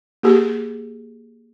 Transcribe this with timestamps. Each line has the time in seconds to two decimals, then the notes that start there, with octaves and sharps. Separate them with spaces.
0.23 A#3 G4 G#4